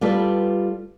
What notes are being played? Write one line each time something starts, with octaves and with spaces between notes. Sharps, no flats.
G3 F4 A4 B4 D5